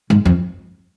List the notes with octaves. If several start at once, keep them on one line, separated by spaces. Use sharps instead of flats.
G#2
F2